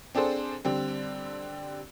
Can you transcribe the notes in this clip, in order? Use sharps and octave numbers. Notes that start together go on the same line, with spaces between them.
C4 D4 G#4 A4 C5
D3 G3 C4